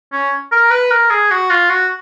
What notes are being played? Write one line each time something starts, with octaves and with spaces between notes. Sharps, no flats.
C#4
A#4
B4
A#4
G#4
F#4
F4
F#4